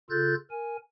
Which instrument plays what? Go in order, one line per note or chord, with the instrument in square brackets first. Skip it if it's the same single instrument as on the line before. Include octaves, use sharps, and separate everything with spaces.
[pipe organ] C#3 F4 A4 F#6 G6 A6
A#4 G#5